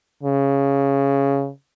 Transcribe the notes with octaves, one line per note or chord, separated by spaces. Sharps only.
C#3